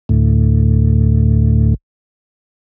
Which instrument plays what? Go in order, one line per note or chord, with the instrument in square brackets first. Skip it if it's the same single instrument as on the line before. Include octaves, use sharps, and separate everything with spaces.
[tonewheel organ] D2 A2